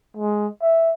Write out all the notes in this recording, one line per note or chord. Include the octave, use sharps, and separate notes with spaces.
G#3
E5